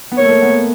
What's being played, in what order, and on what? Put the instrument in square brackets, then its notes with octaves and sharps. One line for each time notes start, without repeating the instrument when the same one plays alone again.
[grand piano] B3
[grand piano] A#3 [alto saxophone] C#5
[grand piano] A3
A#3
B3